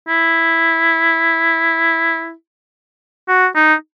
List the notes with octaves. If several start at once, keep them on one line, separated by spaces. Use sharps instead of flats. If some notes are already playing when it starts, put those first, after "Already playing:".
E4
F#4
D#4